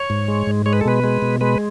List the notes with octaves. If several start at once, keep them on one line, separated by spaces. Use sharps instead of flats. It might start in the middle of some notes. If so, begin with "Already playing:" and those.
Already playing: C#5
G#2
G#3
G#2
G#3 C#5
B4
A4
B2 B4
G#3
B2
G#3 B4